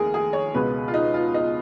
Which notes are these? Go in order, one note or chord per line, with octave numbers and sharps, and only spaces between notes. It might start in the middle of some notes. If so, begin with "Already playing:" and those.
Already playing: F1 D#2 G#4 A#4
G#4
C#5
C#2 B2 G#3 B4
F4
D#4
F4
D#4